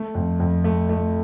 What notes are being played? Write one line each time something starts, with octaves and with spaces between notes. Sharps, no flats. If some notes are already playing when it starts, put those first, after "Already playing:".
Already playing: A3
F2
F2
A3
A3